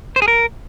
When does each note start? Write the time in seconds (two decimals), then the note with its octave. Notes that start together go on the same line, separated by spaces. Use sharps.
0.16 C5
0.22 G#4
0.28 A#4